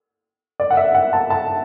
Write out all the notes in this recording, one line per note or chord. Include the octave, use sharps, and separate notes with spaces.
D5
F#5
E5
F#5
A5
A5